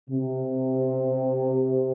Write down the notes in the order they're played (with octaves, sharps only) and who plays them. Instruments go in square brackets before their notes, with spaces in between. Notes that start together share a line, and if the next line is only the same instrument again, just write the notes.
[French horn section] C3